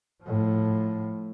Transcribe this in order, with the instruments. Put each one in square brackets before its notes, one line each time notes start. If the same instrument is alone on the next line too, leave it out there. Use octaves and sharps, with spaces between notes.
[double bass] A2 F3